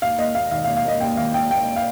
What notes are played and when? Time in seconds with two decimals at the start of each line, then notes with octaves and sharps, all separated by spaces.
0.02 D#2 F5
0.19 A#3 D#5
0.35 D#2 F5
0.51 D#3 F5
0.64 F5
0.67 D#2
0.76 F5
0.85 A#3 D#5
1.01 D#2 G5
1.17 D#3 F5
1.34 D#2 G5
1.51 A#3 G5
1.76 F5